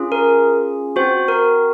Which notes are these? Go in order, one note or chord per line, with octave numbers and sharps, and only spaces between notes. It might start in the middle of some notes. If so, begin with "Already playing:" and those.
Already playing: C#4 F4 G#4
A#4
C4 F#4 C5
A#4